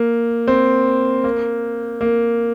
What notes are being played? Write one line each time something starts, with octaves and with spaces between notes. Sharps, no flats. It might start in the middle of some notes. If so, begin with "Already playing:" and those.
Already playing: A#3
C4
A#3
A#3